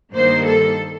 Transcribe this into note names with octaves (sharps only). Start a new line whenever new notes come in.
G2 D#3 G3 A#3 C5
A4